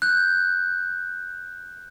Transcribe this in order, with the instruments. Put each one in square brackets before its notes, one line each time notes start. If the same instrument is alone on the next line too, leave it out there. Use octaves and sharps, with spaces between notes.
[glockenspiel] F#6 G6